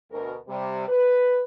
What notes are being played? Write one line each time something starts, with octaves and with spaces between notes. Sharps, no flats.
D2 B2 A#4
C3 G3
B4